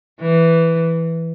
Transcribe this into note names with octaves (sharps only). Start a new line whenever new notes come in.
E3